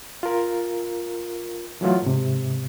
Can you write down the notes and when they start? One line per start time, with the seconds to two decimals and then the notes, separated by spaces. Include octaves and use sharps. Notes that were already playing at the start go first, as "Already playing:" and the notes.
0.23 F4 A#4
1.81 E3 F#3 A3 F4
2.02 G#2 C3